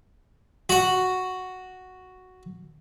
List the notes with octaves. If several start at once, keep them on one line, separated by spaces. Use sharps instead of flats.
F#4 F#5